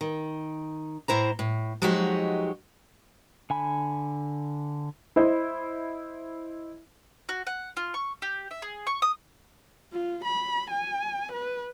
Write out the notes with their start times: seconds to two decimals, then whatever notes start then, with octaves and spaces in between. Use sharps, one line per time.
0.01 D#3
1.08 A2 E4 C5 A#5
1.39 A2
1.82 F3 F#3 G#3 D#4 F#4 G4
3.50 D3 G#5 B5
5.16 E4 C5 D#5
7.29 F#4
7.47 F#5
7.77 F4
7.94 C#6
8.22 G4
8.51 E5
8.62 G#4
8.87 C#6
9.02 D#6
9.93 F4
10.25 B5
10.71 G#5
11.33 B4